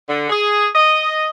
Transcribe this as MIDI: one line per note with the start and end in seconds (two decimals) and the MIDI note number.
0.09 0.28 50
0.30 0.66 68
0.74 1.29 75